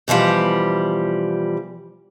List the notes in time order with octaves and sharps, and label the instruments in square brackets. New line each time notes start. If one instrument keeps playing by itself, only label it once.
[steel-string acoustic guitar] B2 E3 F3 G3